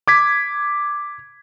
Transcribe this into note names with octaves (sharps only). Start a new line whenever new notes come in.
D6 G#6 B6